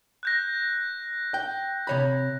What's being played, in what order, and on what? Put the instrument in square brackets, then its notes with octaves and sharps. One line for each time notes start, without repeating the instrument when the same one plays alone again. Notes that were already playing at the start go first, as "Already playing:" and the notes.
[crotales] F#6 G6 A#6
[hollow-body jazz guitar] G5
C3 C#5 B5